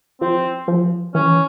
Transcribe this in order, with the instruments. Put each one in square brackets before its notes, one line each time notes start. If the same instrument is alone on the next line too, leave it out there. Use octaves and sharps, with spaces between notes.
[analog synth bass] F3 [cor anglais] C4
[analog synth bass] F3
[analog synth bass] E3 [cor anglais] C#4